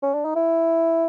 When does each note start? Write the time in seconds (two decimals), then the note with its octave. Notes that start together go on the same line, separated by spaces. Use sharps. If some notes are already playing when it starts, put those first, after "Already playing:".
0.03 C#4
0.14 D4
0.25 D#4
0.35 E4